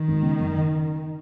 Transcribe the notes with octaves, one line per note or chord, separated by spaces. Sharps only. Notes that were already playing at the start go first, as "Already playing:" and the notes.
Already playing: D#3
G#1
C#3
F#1